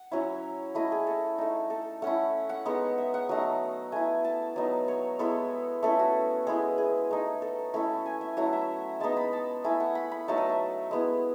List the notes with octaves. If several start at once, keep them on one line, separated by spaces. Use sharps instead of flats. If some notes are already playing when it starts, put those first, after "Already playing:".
Already playing: F#5
F#3 C#4 E4
A3 E4 D#5
G#4
A4
A3 D#4
A4
A3 C#4 E4 F#5
F#5
G#3 B3 D#4 F#5
E5
F#5
F#3 A3 D#4 F#5
A3 E4 G#5
A5
F#3 B3 D#4
C#5
G#3 B3 E4 A4
A3 C#4 E4 A4
F#4
G#3 B3 E4 G#4
G#4
A3 D#4
A4
A3 C#4 E4 A4
G#5
E5
F#3 A3 C#4 E4 F#5
E5
G#3 B3 D#4 A5
B5
A5
A3 E4 G#5
F#5
B5
B5
F#3 A3 D#4 A5
D#5
E5
G#3 B3 E4